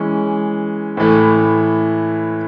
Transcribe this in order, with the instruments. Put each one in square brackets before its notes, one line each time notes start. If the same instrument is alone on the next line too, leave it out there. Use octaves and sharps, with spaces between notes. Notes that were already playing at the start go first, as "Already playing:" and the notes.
Already playing: [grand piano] E3 G#3 C#4
A2 E3 A3